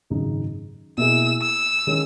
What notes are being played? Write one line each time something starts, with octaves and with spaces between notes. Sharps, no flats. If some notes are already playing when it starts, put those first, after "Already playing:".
G#1 F#2 C#3 G#3 D#4
B2 A#3 E4 G#4 E6
E6
D#3 G#3 C#4